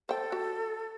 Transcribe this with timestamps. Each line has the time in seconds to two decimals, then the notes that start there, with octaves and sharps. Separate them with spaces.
0.09 A4 C5 G5
0.32 F#4